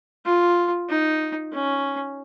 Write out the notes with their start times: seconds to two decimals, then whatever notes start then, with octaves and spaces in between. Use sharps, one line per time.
0.25 F4
0.89 D#4
1.53 C#4